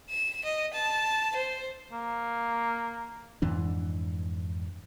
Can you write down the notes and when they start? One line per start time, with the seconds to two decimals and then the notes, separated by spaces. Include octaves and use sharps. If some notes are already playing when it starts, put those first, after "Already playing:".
0.10 E7
0.45 D#5
0.73 A5
1.36 C5
1.92 A#3
3.42 F2 G#2 E3 D4